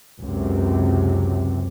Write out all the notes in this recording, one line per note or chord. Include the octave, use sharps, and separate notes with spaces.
C#2 F#2 C3